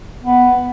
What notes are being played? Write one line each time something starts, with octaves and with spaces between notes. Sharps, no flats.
B3